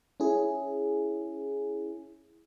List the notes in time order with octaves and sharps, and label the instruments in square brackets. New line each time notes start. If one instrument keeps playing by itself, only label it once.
[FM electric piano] C#4 E4 G#4